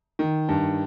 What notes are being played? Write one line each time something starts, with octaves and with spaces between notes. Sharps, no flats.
D#3
G2